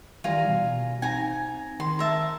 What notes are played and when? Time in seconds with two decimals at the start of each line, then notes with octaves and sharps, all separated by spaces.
0.24 D#3 E3 G3 F4 G#5 A#5
0.49 B2
1.02 C4 D#4 G#5 A#5
1.80 D#3 C6
1.99 A#4 E5 A5